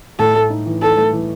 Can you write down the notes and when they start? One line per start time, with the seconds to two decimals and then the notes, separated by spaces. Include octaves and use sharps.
0.19 A2 A4
0.35 A3
0.50 D#4
0.66 E3
0.81 D#4 A4
0.97 A3
1.13 E3